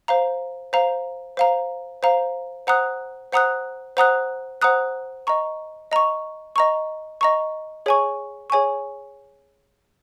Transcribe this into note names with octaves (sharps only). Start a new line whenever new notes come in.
C5 F5 A#5
C5 F5 A#5
C5 F5 A#5
C5 F5 A#5
C5 F#5 A#5 D#6 F#6
C5 F#5 A#5 D#6 F#6
C5 F#5 A#5 D#6 F#6
C5 F#5 A#5 D#6 F#6
D#5 A#5 C#6
D#5 A#5 C#6
D#5 A#5 C#6
D#5 A#5 C#6
G#4 C#5 G#5 C#6
G#4 C#5 G#5 C#6